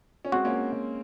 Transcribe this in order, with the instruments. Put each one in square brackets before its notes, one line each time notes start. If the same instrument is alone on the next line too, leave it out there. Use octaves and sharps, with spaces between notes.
[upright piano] C#4
[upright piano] G#3 C4 [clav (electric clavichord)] F#4
[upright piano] A#3 C#4